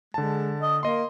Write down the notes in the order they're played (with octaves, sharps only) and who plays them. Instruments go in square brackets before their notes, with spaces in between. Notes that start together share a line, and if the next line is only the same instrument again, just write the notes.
[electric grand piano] D3 A5 [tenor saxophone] G#3
[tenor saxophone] D#5
[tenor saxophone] A#3 [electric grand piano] D#5 C6